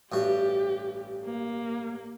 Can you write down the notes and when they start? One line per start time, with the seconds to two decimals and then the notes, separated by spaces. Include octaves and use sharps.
0.12 A1 G2 F#4 G4
1.25 A#3